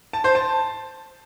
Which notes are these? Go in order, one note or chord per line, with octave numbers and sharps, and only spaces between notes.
A5
C5
A5